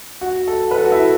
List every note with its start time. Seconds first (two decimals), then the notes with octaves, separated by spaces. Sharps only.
0.21 F#4
0.47 A4
0.71 B4
0.78 A4
0.85 F#4
0.92 E4